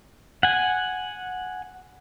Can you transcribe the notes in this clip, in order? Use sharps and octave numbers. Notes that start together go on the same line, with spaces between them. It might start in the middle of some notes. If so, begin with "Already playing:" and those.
F#5 G#5